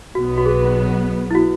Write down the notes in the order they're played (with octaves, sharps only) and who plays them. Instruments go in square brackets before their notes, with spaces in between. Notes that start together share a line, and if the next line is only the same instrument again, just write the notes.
[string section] B1 B2 F#3 B3 [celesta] F#4
[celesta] F#4
G#4
E4
F#4